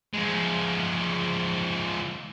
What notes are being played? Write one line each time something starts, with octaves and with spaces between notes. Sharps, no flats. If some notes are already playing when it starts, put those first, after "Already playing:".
F3 G#3